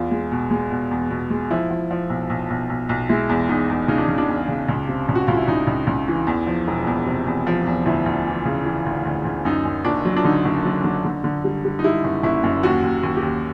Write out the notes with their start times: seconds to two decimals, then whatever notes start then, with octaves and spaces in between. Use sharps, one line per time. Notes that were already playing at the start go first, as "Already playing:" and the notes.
Already playing: E2 F4
0.11 G#3
0.32 B2
0.51 G#3
0.71 B2
0.91 E2
1.10 B2
1.31 G#3
1.50 F3 E4
1.70 F3
1.91 F3
2.10 B1
2.30 B1
2.50 B1
2.70 B1
2.89 B1
3.09 G#3 E4
3.29 E2
3.49 E2 D#4
3.70 E2
3.88 C#3 D#4
3.98 D4
4.08 C#3
4.18 D4
4.29 E2
4.48 C#3
4.68 C#2
4.88 C3
5.09 C#2
5.15 F#4
5.27 C#2 F4
5.37 E4
5.48 C#2 D#4
5.67 C#2
5.87 C#2
6.08 E3
6.27 E2
6.47 F3
6.68 E1
6.87 E2
7.07 C3
7.27 E2
7.47 F3
7.66 E2
7.86 D2 E4
8.06 D2
8.27 E3
8.45 C#3
8.65 E3
8.86 D2
9.06 D2
9.25 D2
9.45 F#2 D#4
9.65 F#2
9.85 F#1 D4
10.05 F#3
10.16 D4
10.24 D3 D#4
10.45 F#1
10.65 F#3
10.84 D3
11.05 D3
11.24 D3
11.44 G3
11.65 G3
11.79 D#4
11.84 G3 E4
12.04 F#1
12.23 F#1 E4
12.43 F#2
12.63 D#2 F#4
12.83 D#2
13.03 D#2
13.17 G4
13.23 D#2